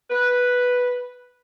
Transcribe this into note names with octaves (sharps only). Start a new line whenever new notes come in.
B4